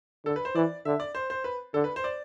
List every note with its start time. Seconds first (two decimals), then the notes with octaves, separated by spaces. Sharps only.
0.25 D3 A4
0.36 B4
0.45 C5
0.55 E3 D5
0.85 D3 E5
1.00 D5
1.15 C5
1.30 C5
1.44 B4
1.74 D3 A4
1.84 B4
1.96 C5
2.04 D5